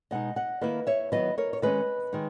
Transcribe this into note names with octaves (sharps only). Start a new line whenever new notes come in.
B2 G#3 D#4 D#5 F#5
D#5 F#5
D#3 A#3 E4 B4 D#5
C#5 E5
D#3 F#3 B3 E4 B4 D#5
A#4 C#5
C#5
D#3 G#3 C#4 B4 D#5
D#3 G#3 D#4